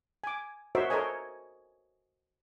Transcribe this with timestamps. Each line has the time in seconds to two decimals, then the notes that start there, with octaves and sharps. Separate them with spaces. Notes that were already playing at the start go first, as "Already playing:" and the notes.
0.24 G#5 D6
0.75 F#4 A#4 C5 C#5 D#5 E5
0.90 A4 A#4 C5 C#5 D#5 G#5